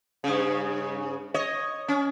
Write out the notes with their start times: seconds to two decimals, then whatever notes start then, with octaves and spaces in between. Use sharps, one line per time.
0.24 G2 C#3
1.34 C#5 D#5
1.88 C#4